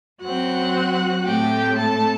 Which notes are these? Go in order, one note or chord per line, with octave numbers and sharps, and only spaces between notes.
F#2 F#3 C4 F#4 F#5
A2 A3 C4 G4 G5
A4 A5